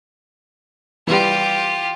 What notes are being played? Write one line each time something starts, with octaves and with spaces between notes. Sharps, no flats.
E3 G3 F4 G4